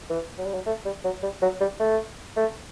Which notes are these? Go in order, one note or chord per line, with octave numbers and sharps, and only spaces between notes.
E3
F#3
G3
F#3
A3
G3
F#3
G3
F#3
G3
A3
A3